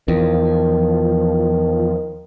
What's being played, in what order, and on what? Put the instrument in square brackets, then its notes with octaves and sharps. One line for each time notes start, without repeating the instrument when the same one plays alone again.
[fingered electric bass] E2 [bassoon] D#3 [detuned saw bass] F3